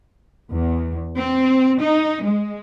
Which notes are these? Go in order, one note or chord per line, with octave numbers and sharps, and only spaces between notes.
E2
C4
D#4
G#3